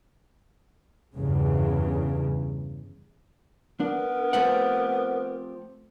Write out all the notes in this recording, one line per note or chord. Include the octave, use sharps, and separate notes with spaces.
E2 G2 C#3
B3 D4 A#4
F3 A3 C4 G4 B4 F#5